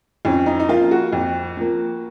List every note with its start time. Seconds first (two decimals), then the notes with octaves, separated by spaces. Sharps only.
0.25 F2 C#4
0.46 D#4
0.60 D#4
0.69 F3 A#3 F4
0.91 F#4
1.12 F2
1.57 F3 A#3